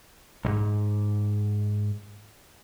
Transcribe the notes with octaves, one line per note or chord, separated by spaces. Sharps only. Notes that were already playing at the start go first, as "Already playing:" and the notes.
B1 G#2